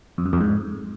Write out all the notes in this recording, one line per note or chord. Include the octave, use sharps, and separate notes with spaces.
F2
F#2
F2
G#2